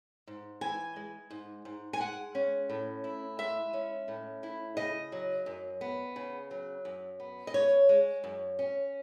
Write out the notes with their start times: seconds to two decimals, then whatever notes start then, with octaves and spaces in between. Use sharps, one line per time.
0.27 G#2
0.61 E3 G#5
0.96 G#3
1.31 G#2
1.65 G#2
1.93 G#5
2.00 G#3 F#5
2.35 C#4
2.70 A2
3.04 E4
3.39 G#3 E5
3.73 C#4
4.08 A2
4.43 E4
4.77 C#3 D#5
5.12 F#3
5.46 F#2
5.81 B3
6.16 C#3
6.51 F#3
6.85 F#2
7.20 B3
7.47 D#5
7.54 C#3 C#5
7.89 G#3
8.24 F#2
8.59 C#4